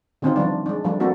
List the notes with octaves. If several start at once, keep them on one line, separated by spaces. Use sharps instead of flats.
D3 D#3 C4 C#4 D#4 F4
E3 F3 G3 D4
G#3 D4
F3 G3 A3 D4
A3 A#3 C4 D4 F#4 A4